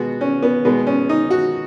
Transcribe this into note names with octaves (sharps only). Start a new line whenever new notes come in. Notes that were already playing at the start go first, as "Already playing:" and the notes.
Already playing: B2 G#3 B3 F#4
C#4
B3
B2 G#3 B3
C#4
D#4
F#4